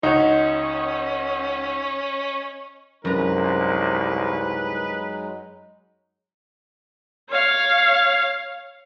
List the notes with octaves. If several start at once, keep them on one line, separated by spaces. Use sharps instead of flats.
C#2 C#4 D#4 F#4 C#5 D#5
C2 F#2 F#3 G#3 D#4 B4 A#5
C#5 F5